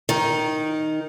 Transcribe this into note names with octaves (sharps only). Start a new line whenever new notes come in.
D#3